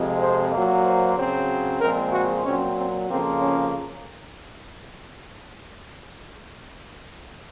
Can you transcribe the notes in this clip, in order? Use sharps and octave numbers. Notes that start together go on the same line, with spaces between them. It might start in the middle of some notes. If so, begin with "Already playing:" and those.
Already playing: F2 C3 F3 G#3
C5
A#2 F#3 A#3
C5
C#3 F#3 C4
A#2 F3 G#3 C4 A#4
F#4
A#2 F#3 C4 C#4
C4
F2 C#3 F3 A#3 C4
C#4